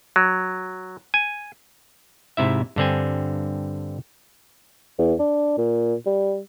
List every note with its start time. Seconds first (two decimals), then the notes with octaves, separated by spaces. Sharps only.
0.16 F#3
1.14 G#5
2.37 G#2 C3 E4 E5
2.76 G2 D3 C4 G#5
4.99 E2
5.19 D4
5.58 A#2
6.06 G3